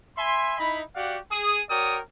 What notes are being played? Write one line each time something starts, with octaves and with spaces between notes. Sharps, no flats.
E5 G#5 B5 C6
D#4 E4 D#5 B5
F#4 G4 D5 F5 F#5
G#4 D#6
F#4 A#4 C#5 D5 G5 D#6